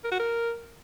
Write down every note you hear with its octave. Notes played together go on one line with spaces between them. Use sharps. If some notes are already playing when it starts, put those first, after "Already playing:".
A#4
F#4
A#4